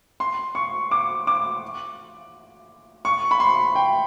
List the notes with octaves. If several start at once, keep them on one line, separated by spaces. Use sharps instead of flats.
C6
C#6
D6
D6
C#6
B5
C6
G5